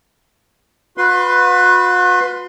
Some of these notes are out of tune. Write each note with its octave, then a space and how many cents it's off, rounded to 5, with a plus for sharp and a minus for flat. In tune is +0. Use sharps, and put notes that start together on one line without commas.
F#4 -45 B4 +5 C6 +0